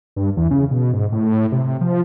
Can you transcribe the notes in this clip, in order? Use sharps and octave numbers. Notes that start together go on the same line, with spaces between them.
G2
E2
C#3
B2
G#2
A2
C3
F3